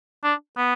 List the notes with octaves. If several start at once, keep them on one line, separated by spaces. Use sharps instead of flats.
D4
B3